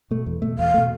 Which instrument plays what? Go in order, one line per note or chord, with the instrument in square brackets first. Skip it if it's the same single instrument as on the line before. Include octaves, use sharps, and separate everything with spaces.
[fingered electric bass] B2 A3
E2
B2 A3
[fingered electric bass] E2 [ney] F5
[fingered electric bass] B2 A3